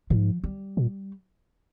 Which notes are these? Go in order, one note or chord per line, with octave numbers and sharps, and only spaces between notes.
G#2 F3
G3
A#2